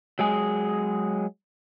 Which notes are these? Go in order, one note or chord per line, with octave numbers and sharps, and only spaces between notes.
F#3 G#3 G#4